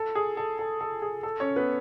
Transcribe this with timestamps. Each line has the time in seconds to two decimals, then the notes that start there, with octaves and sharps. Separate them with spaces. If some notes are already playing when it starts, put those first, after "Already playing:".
Already playing: A4
0.15 G#4
0.37 A4
0.59 A4
0.81 A4
1.02 G#4
1.23 A4
1.40 C#4 C#5
1.56 B3 B4